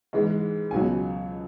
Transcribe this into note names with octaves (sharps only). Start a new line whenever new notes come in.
G#2 E3 G#3
C#2 B2 F#3 G#5